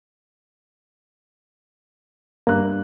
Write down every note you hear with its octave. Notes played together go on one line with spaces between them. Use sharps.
G2 A#3 F#6